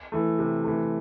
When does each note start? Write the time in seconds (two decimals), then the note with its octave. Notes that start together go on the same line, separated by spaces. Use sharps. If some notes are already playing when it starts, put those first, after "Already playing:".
0.12 E3 A3
0.39 C3
0.64 E3 A3